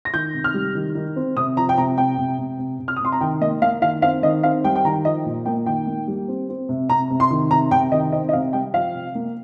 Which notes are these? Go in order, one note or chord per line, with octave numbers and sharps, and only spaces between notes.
A#6
D#3 G6
C3
F6
G3
D#3
D#3
C4
C3 D#6
F3 A#5
G5
C3 A#5
C3 G5
C3
C3
C3
C3
F6
D#6
C3 C6
A#5
D#3 G5
A#3 D#5
A#3 F5
D#3 F5
C4 F5
D#3 D#5
C4 F5
G3 G5
G5
D#3 A#5
F3 D#5
A#2
A#3 G5
D#3 G5
A#3
G3
C4
C4
C3
C3 A#5
C3
C6
D#3
C3 A#5
C3 G5
D#3 D#5
C4 D#5
D#5
C3 F5
G3 G5
F3 F5
C3
A#3